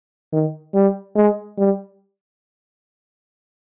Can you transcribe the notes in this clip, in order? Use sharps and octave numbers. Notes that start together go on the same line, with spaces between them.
D#3
G3
G#3
G3